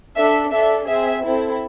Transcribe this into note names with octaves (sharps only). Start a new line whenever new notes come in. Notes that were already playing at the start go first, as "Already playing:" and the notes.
D4 A4 E5
D4 A4 E5
C4 G#4 E5
C4 E4 A4